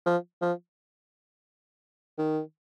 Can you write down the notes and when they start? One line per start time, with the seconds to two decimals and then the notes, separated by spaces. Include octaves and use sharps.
0.06 F3
0.42 F3
2.19 D#3